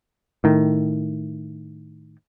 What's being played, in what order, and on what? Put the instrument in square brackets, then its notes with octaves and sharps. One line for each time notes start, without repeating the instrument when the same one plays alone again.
[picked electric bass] A2 D#3